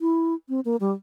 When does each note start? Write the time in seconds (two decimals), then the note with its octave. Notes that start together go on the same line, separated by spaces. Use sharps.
0.01 E4
0.49 C4
0.65 A#3
0.80 G3